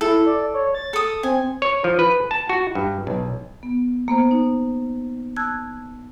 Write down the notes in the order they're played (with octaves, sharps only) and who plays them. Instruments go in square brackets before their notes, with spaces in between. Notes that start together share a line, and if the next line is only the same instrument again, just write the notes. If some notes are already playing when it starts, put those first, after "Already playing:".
[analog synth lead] E4 [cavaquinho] A4
[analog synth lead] D5
C#5
A6
[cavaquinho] A4 D#6
[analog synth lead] C4 [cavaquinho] G#5
[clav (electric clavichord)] C#5
F3
B4
A5
F#4
G2
B1
[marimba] B3
A#3 B3 C5
D#4
A5 E6 F#6 G#6